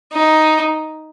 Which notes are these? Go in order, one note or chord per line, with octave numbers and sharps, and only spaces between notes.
D#4